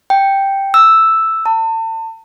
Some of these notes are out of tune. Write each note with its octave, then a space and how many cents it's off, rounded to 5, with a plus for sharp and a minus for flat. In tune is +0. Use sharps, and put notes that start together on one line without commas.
G5 +0
E6 +0
A5 +35